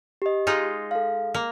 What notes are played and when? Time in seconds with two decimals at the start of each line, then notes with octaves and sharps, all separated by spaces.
0.22 G4 D#5
0.47 G#3 D#4 F4
0.91 A4 F5
1.34 A#3